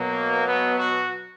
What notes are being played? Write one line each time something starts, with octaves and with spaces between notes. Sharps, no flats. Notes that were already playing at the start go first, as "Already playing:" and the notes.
Already playing: B2 F#3 A#3
B3
F#4